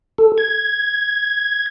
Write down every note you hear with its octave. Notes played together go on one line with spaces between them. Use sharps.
A4
G#6